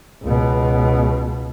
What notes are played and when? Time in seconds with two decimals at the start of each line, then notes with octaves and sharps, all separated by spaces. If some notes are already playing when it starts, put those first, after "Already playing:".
0.23 C#2 B2